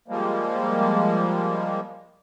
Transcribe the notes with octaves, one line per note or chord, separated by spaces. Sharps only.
F3 G3 G#3 A#3